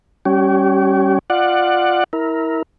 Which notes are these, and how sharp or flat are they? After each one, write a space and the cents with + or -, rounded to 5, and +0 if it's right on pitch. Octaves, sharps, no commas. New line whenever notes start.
G3 +0 C#4 +0 G4 -40
F4 +0 D5 +20 F#5 +0
E4 -25 A#4 +0